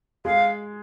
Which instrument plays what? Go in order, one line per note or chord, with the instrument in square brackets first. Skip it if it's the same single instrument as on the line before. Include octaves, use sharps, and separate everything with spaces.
[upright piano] G#3 [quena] F5